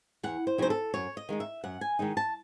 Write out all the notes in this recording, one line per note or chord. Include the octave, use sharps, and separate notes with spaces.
E2 F#5
C5
C#3 F#3 C4 D#4 C5
A4
F#2 C#5
D#5
D#3 G#3 D#4
E5
F#2 F#5
G#5
D#3 G#3 D#4
A5